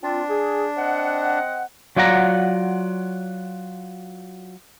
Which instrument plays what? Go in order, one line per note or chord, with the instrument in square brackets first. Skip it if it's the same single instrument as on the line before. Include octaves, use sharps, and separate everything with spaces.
[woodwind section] C4 F4 [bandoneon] D4
[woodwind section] G#4
C4 D#5 F#5
[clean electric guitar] F#3 F4 D5 F#5 A#5